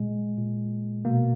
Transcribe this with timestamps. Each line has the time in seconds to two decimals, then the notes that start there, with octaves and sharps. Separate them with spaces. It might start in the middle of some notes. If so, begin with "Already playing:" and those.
Already playing: A#2 G#3
0.38 A#2
1.05 B2 A#3